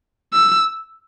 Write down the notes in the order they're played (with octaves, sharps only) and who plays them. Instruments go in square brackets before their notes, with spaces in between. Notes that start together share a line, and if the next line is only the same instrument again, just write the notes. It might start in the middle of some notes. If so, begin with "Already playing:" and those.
[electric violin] E6